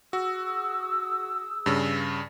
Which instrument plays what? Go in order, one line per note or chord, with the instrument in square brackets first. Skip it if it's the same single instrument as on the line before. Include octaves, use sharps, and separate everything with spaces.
[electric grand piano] F#4 [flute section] G#4 D#6 E6
[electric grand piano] G2 C#3